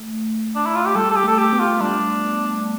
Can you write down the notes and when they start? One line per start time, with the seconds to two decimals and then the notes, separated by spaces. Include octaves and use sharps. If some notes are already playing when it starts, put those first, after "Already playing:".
Already playing: A3
0.56 D4
0.66 E4
0.75 F4
0.86 G4
0.95 G3 A4
1.11 A4
1.16 G4
1.24 A3 A4
1.38 G4
1.53 B3
1.60 F4
1.81 G3 D4